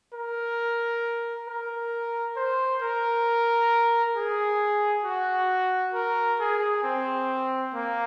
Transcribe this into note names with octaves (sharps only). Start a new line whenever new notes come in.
A#4
A#4
C5
A#4
G#4
F#4
A#4
G#4
C4
A#3